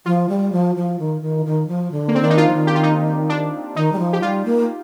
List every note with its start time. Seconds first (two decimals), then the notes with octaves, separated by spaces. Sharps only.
0.06 F3 F4
0.29 G3
0.53 F3
0.76 F3
0.99 D#3
1.21 D#3
1.46 D#3
1.68 F3
1.92 D3
2.08 A#3
2.15 C4
2.21 D#3 D4
2.30 D#4
2.37 F4
2.48 F3
2.53 D#3
2.67 G4
2.75 F4
2.83 D#4
3.29 D4
3.76 D#3 D#4
3.92 G3
3.99 F3
4.13 G4
4.22 G3 F4
4.46 A#3